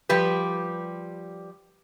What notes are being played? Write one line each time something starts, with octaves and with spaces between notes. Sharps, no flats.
F3 G3 G4 B4